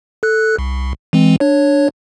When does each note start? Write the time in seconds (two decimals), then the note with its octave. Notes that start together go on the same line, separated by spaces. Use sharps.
0.23 A4 F#6
0.58 C2
1.13 E3 G#3 C4
1.40 D4 C#5